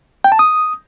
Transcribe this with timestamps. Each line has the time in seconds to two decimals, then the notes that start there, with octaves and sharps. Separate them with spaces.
0.24 G5
0.32 A5
0.39 D#6